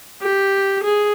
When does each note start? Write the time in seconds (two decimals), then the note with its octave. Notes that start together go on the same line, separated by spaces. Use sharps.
0.22 G4
0.84 G#4